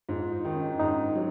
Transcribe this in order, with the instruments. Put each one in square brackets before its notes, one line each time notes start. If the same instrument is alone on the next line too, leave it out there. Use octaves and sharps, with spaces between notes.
[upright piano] G#2 [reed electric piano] F4
[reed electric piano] D#4
[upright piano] D#3 [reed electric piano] D#4
[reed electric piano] C#4
[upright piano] G#2 [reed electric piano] D#4
[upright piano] F#3